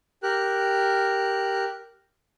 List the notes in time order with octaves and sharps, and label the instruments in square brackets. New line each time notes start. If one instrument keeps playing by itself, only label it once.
[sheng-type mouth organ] G4 A#4 F#6